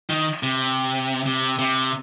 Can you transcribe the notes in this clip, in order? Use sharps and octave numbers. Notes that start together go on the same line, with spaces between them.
D#3
C3
C3
C3